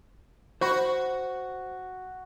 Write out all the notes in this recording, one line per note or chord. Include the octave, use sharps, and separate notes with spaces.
F#4 C5 B5